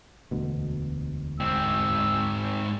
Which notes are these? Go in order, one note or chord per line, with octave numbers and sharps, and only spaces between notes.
E1 D2 B2
G#2 C4 E6